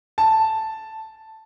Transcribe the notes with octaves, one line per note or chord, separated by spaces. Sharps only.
A5